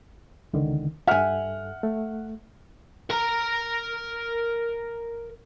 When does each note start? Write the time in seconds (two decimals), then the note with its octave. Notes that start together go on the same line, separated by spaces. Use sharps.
0.53 C#2 D3 D#3
1.07 G2 A4 E5 F#5 G#5 F6
1.83 A3
3.10 A#4 A#5